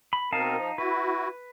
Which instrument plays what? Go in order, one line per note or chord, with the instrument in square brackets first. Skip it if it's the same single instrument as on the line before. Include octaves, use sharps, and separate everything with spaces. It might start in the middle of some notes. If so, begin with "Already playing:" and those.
[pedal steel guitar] B5
[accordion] B2 C4 A#4 [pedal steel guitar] D#4 F5 A5
[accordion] F3
[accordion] E4 F#4 [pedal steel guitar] B4